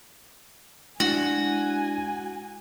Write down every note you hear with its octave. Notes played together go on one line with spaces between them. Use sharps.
G#3 D4 E4 F#4 G#5